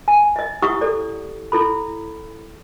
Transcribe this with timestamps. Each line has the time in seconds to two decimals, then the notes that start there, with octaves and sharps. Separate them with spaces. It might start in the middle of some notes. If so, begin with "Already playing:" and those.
0.08 G#5
0.36 D#5 E5
0.62 E4 G4 E5 F#5 C#6 D#6
0.81 A4 D5
1.52 E4 A4 B5